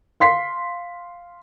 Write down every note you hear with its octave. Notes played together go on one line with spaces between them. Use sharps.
F5 C6 B6 C7